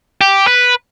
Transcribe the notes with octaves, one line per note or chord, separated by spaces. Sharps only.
G4
B4